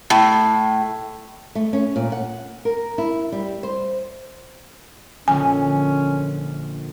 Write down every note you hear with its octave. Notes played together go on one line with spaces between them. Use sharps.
A2
A3
C#4
A#2
F#5
A#4
E4
G3
C5
A#1 D3 G#3 C#4 G#5